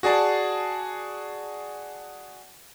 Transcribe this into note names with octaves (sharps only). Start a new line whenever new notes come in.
F#4 G#4 D5 A5